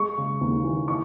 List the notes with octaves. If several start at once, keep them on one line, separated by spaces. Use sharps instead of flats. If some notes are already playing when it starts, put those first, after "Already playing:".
Already playing: G#3 C#6
C#3
D#2
E3
C#6